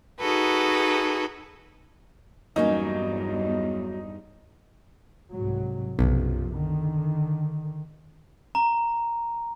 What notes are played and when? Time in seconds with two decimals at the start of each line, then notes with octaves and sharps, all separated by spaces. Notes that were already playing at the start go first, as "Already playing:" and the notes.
0.19 D#4 F#4 G#4 A4 B4
2.56 E2 G2 F#3 A#3 C#4 D#4
5.32 C2 G#2 F#3
5.99 B1 F#2 C3 F3
6.53 D3 D#3
8.55 A#5